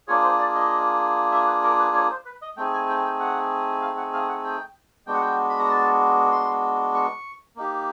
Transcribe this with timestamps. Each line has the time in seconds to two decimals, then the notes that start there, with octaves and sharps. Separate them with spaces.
0.08 A#3 D4 F4 G#4 C#5
0.23 C5
0.39 D5
0.55 D#5
1.32 E5
1.47 B4
1.63 A#4
1.79 B4
1.95 C#5
2.10 C5
2.25 B4
2.42 D#5
2.57 A3 C4 D#4 G#4 G5
2.73 G#5
2.88 G5
3.04 G5
3.20 F#5
3.81 F5
3.97 F#5
4.13 F5
4.29 F#5
4.44 G5
5.07 G#3 B3 D4 F#4 G5
5.14 F#5
5.21 G5
5.49 B5
5.59 A#5
5.68 A5
6.31 C6
6.94 C#6
7.56 A#3 D#4 G4